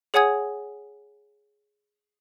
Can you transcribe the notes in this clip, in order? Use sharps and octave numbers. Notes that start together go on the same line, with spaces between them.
G#4 C#5 F#5 G#5 D#6 G#6